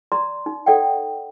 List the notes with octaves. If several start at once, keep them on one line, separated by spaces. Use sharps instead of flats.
D5 A#5 C6
D#4
A4 D5 F#5 G5